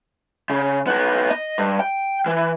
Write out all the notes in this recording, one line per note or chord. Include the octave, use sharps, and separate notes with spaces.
C#3
B3 D#4
D#5
G2
G5
E3